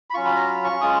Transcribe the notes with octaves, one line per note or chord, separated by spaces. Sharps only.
B5
F#3 C#4 F4 C#6
B5
A#5
B5
C#6
G#3 C#4 F4 D#6